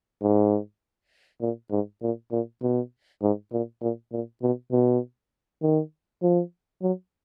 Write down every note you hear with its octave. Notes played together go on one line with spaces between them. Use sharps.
G#2
A#2
G#2
A#2
A#2
B2
G#2
A#2
A#2
A#2
B2
B2
D#3
F3
F#3